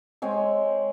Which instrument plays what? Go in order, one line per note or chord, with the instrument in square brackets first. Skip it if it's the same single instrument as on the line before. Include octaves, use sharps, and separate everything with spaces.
[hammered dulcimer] G#3 C4 C#5 G#5